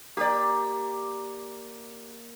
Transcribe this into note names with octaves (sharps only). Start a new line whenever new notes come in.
A#3 G4 D5